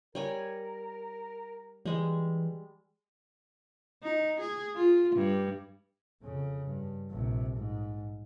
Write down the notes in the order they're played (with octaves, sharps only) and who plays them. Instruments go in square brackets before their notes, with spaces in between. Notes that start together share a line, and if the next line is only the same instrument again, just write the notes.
[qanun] G3 C#5 G#5 [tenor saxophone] A#4
[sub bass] E3 [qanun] G3 G#3
[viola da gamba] D#4
G#4
F4
G2
[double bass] F2 C#3
G2
A#1 C3
G#2